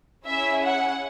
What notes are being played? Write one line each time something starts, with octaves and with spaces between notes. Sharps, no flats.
C#4 E4 G#4 E5
F#5